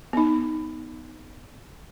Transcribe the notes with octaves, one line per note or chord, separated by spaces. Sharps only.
B3 D#4